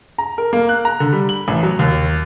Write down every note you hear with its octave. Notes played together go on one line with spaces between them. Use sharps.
A#5
A#4
A#3
F#6
A#5
D3
G3
F#7
A1
F#3
D#2